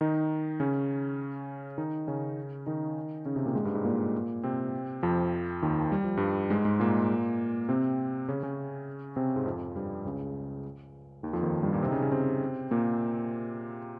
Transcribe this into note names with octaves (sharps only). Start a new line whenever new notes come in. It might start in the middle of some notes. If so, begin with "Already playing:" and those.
D#3 D#4
C#3 C#4
D#3 D#4
C#3 C#4
D#3 D#4
C#3 C#4
C3 C4
A#2 A#3
G#2 G#3
G2 G3
G#2 G#3
A#2 A#3
C3 C4
F2 F3
D#2 D#3
G3
F3
G2 G3
G#2 G#3
G#2 G#3
A#2 A#3
C3 C4
C#3 C#4
C#3 C#4
C3 C4
G#2 G#3
F2 F3
G2 G3
C#2 C#3
D#2 D#3
F2 F3
D#2 D#3
G2 G3
A#2 A#3
C3 C4
D#4
C#3 C#4
C#3 C#4
C3 C4
A#2 A#3